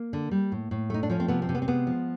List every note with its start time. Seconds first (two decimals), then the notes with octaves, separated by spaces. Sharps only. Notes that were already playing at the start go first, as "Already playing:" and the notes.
Already playing: A#3
0.13 D3
0.31 G3
0.52 A2
0.71 A2
0.90 A3 D#4
1.03 D4
1.09 F3 C#4
1.20 C4
1.28 C3 B3
1.42 C4
1.49 C3
1.55 B3
1.62 C4
1.68 G#3 B3
1.87 F3